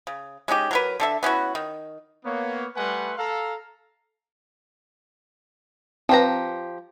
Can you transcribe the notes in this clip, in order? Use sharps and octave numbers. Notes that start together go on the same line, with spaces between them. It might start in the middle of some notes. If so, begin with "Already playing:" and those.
C#3
G#3 C#4 D#4 G4
F#3 A#4 B4
D3 A4 E5
B3 C#4 E4 F#4
D#3
A#3 B3 C#5
G3 A3 B4 F#5 G#5 C6
A4 F5 A#5
F3 C4 G4 B4 A#5